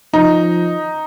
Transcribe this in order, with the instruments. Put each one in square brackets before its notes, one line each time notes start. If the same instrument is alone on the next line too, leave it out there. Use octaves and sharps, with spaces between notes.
[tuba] F3 [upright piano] D#4